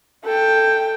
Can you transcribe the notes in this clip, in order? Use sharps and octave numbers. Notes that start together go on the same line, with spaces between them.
A4 G5